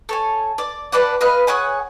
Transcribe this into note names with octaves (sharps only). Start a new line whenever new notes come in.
A4 C#5 G#5
D5
D4 B4 D5 F#5
B4 D#5 F5 F#6
G#4 C#5 F#5 G#5